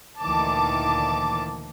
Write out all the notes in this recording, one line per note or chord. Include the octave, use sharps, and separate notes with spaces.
D2 A#2 D#3 E3 A5 D6